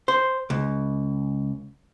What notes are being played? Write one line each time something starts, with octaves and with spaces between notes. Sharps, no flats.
C5
C#2